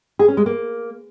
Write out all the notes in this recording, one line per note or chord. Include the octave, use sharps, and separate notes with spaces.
G#4
C#4
G#3
A#3